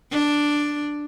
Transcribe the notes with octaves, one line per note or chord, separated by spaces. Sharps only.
D4